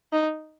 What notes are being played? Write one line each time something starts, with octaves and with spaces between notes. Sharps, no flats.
D#4